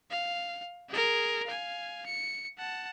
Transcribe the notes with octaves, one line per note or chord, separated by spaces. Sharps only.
F5
G#4 A#4
F5 G#5
C#7
F#5 A5